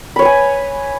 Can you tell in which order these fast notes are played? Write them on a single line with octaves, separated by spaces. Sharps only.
B5 C#5 B4 G#5